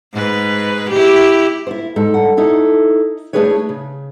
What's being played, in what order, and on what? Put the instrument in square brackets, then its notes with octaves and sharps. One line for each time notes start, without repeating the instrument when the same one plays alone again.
[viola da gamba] G#2 B4
E4 G4
[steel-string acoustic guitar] E4 F4 C5
G#2 A4
G2 F#5
D#4 E4 A4
A3 D4 E4 G#4 B4 C#5
C#3